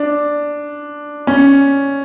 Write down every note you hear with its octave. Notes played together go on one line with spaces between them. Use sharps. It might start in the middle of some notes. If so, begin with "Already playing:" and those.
Already playing: D4
C#4